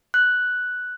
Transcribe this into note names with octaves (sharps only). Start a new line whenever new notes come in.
F#6